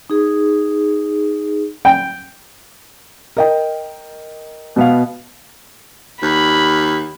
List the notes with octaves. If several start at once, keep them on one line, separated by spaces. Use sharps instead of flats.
D#4 G#4
G5
A#4 D#5 G5
B2 B3 F5
D#2 B5